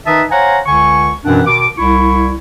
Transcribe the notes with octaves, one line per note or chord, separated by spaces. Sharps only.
D#3 D#4 B4 E5 A5 D#6
C5 C#5 F5 F#5 G#5 A#5
C#2 D3 G#5 C#6
F#2 B2 E3 C4 D4 F#5
B2 D#3 D6
C2 E4 C#6